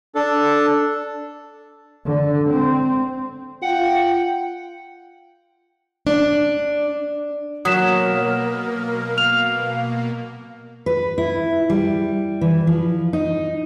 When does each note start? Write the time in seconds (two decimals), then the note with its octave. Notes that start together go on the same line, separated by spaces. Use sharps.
0.15 D4 A4
2.06 D3
2.50 C4
3.63 F4 F#5 G5
6.07 D4
7.65 B2 F#3 A#3 A#4 D#6 B6 E7
9.17 F5 F6 F7
10.86 B4
11.18 E4
11.70 G3
12.41 E3
12.67 F3
13.13 D#4